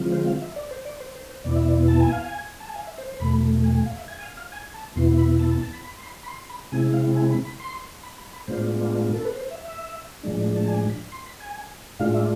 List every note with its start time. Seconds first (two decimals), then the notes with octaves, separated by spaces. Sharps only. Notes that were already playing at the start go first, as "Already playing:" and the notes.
Already playing: D3 F3 G#3 C4 F4
0.12 C5
0.27 F5
0.42 E5
0.56 D5
0.71 C5
0.85 D5
1.00 C5
1.15 C5
1.29 C5
1.44 E2 B2 B3 E4 D5
1.56 E5
1.68 D5
1.88 A5
2.01 G#5
2.12 F5
2.24 G#5
2.60 A5
2.68 G#5
2.76 F5
2.87 E5
2.98 C5
3.09 C5
3.20 E2 B2 A3 B5
3.64 G#5
3.75 G#5
3.86 F5
3.97 E5
4.08 G#5
4.19 G#5
4.23 F5
4.37 F5
4.52 G#5
4.74 A5
4.96 E2 B2 B3 E4 C6
5.18 B5
5.39 A5
5.51 A5
5.62 A5
5.73 B5
5.84 B5
5.96 C6
6.06 B5
6.23 B5
6.28 C6
6.49 B5
6.72 C3 G#3 C4 E4 G#5
6.94 F5
7.16 G#5
7.30 B5
7.45 B5
7.60 C6
8.03 B5
8.18 B5
8.33 B5
8.47 A2 G#3 B3 D4 F4 C5
9.14 A4
9.25 B4
9.36 C5
9.50 E5
9.65 E5
10.23 A2 F3 G#3 D4
10.56 A5
10.68 G#5
10.90 B5
11.12 C6
11.26 B5
11.40 G#5
11.99 A2 G#3 D4 F4 F5
12.14 E5